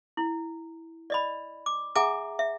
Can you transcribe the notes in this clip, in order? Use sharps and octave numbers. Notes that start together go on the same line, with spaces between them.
E4
D5 D#5 B5
D6
G#4 E5 F#5 G#5 A#5 D6
E5